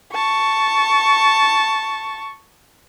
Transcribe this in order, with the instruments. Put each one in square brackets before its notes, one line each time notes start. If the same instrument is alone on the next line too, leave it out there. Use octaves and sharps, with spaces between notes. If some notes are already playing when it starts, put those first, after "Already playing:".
[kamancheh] A5 C#6